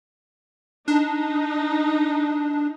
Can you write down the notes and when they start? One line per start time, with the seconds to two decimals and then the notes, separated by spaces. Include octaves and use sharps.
0.88 D4 D#4